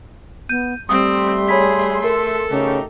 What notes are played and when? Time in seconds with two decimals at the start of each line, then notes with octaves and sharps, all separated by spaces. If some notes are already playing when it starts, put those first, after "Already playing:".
0.49 B3 G6 D#7
0.89 G3 A3 C4 E5 C6 D#6
1.49 G#4 C#5 B5 B6
2.04 A4 A#4
2.50 C#3 A3 D#4 G4